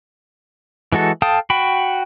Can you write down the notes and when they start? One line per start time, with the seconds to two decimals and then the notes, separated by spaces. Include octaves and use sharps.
0.92 E3 G#3 F#4 A4
1.22 A4 F5 G5 A5 D#6
1.50 F#4 G5 B5